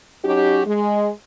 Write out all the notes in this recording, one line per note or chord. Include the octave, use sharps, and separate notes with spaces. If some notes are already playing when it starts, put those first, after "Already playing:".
F#3 C#4 D#4 F#4 G4
G#3